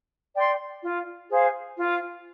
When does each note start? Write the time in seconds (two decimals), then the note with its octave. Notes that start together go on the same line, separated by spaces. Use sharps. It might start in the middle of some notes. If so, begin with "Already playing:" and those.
0.34 D5 G5 C6
0.82 F4
1.30 G#4 C5 F5
1.77 F4